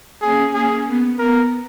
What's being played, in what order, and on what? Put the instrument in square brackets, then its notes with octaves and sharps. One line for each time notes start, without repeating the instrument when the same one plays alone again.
[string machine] A#3 C#4 [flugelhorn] G#4
[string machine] A#3 C#4 [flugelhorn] G#4
[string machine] B3
[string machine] B3 [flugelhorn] A#4